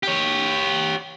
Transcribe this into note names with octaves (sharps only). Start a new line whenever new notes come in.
G4 C#5